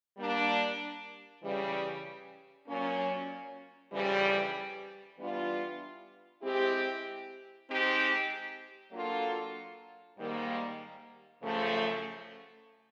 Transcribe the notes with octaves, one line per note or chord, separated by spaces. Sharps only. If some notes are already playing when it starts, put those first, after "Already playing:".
G3 A#3 D4
C#3 E3 G3
A#2 F#3 A#3 C#4
F2 C#3 E3 G3
E3 G3 B3 D4 F4
G#3 C4 E4 G4
G#3 C4 D#4 G4
F#3 A#3 D4 F4 A4
G#2 D#3 G3 A#3
F#2 C#3 F3 A3